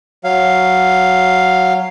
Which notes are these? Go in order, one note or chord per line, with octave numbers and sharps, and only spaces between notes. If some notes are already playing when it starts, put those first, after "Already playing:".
F#3 F5